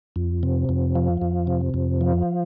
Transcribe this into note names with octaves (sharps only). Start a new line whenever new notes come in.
F2
C3
F2
F3
F2
C3
F2
F3